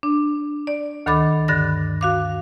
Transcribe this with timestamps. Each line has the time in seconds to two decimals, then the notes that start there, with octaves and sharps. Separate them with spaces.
0.03 D4
0.67 D5
1.06 D2 D#3 A4 B5 D6 A6
1.48 G2 D3 F#6 A6 A#6
2.01 F#4 F5 D6